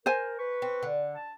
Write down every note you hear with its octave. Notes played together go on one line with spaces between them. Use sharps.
A#4 C5 G#5
B4 C#6
C4
D3
A5